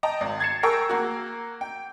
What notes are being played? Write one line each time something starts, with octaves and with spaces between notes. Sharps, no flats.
D#5 G5 A5 A#5
G#1
G#6 A6 C7 C#7 E7
G#4 A#4 G5 A5 C#6 E6
A#3 F#4
G5